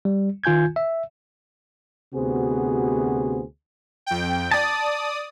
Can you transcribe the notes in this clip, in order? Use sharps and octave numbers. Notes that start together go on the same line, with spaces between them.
G3
D#3 F4 G#5 G6 G#6
E5
D2 C3 B3 F#4 G#4 C5
F2 G5
D5 A5 D#6